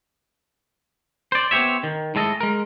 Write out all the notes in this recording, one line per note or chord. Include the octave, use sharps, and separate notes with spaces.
C5 D5
B3 C4 D4 G4 C#5 E5
D#3
A2 G#3 A4 D#5
G#3 A#4